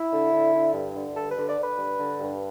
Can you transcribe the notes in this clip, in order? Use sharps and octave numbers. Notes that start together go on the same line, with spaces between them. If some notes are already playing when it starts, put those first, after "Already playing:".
Already playing: E4
D3
D3
D3
G2
D3
G2 A4
B4
D3
D5
D3
B4
G2
D3
G2